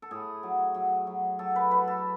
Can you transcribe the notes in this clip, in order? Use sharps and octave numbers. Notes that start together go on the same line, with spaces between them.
A4
A2 G#4
F#3
F#3
F#3
F#3 A4
B4
F#3 B4
A4